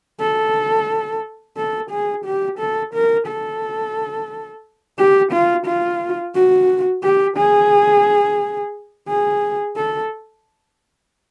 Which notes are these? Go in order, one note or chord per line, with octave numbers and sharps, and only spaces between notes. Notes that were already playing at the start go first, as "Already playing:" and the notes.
A4
A4
G#4
G4
A4
A#4
A4
G4
F4
F4
F#4
G4
G#4
G#4
A4